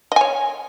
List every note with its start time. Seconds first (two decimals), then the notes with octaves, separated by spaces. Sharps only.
0.12 D#5
0.16 G#5
0.21 C#5